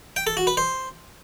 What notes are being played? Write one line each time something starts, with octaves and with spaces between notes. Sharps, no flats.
G5
A4
F#4
B4
C5